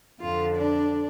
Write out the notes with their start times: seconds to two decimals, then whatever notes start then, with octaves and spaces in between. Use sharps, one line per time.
0.21 F2 D3 F4
0.57 D4